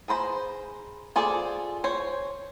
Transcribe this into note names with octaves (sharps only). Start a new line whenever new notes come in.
G#4 B4 C5 A#5
F4 G#4 A4 C5 D5
C5 C#5